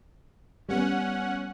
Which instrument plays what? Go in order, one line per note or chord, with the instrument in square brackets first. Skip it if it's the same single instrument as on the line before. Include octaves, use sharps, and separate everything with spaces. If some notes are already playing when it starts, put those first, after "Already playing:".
[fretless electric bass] G3 A#3 B3 [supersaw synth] C#4 F#5